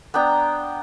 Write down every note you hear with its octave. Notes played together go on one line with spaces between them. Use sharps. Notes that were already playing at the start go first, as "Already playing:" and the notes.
B3 D4 G5 A#5